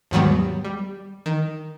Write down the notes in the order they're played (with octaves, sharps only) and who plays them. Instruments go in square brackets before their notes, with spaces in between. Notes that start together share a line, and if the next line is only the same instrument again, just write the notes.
[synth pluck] D#2 G#2 D#3 F#3 G3 B3
G3
D#3